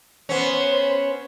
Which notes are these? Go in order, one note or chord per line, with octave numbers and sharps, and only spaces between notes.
B3 C#4 C5